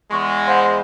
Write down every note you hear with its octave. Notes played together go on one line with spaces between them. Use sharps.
E2 G#3 C6 C#6
C5 F5 F#5